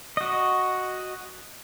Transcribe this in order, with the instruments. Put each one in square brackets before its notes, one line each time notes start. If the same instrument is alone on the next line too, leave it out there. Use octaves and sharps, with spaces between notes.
[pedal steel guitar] F#4 D#5